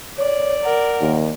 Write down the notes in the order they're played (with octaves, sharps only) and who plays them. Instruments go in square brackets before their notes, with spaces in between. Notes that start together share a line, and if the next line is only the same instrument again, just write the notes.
[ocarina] C#5 [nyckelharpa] D5
[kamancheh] A#4 [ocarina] F#5
[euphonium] D#2